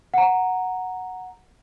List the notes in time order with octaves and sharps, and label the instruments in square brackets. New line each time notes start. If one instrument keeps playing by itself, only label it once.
[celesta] F#5 A#5